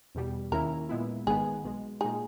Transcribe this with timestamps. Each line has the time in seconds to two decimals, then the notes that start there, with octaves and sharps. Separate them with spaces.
0.15 E2 B2 G3
0.52 D#2 D#3 A#3 C#4 E4 A#4
0.89 A#2 G#3 B3 E4
1.26 G#1 G#2 D#3 G#3 B3 G#4
1.64 B1 B2 G#3
2.00 A#2 G#3 D#4 G#4